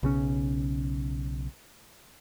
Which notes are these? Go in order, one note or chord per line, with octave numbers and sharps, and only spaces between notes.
B1 C#3 C#4